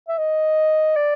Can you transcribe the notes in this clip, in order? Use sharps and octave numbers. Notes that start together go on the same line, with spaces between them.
E5
D#5
D5